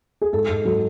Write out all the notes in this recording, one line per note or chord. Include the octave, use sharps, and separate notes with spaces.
G#4
G#2 A4
G#2
F#3 A4